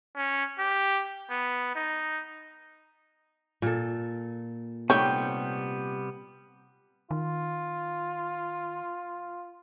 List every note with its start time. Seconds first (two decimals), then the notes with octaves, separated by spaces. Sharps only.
0.16 C#4
0.59 G4
1.30 B3
1.76 D#4
3.62 A#2 A4
4.90 C3 G3 A3 B3 D#4 C#5 G5
7.11 D#3 F4